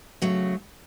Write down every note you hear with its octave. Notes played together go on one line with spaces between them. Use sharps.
C#3 F#3 A3